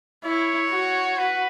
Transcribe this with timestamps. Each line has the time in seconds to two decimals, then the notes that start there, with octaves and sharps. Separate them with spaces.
0.24 E4 C#5
0.71 F#4
1.18 B4